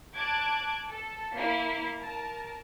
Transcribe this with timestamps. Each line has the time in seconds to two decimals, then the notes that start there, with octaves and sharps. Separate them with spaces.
0.16 A5 D6 F#6 G#6 D7
0.89 A4
1.34 A#3 E4
1.97 A#4 A5